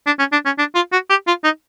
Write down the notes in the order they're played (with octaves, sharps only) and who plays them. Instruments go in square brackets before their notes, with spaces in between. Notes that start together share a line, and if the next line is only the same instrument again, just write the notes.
[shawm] D4
C#4
D4
C#4
D4
F4
F#4
G4
F4
D#4